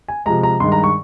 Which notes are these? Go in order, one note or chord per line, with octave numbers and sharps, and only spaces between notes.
G#5
C3 F3 G#3 A#5
A#5
G2 D#3 G#3 C6
A#5
C#6